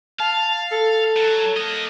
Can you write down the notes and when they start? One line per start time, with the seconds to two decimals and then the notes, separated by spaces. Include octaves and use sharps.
0.20 F5 A5
0.71 A4
1.16 F#3
1.56 A#3 D#5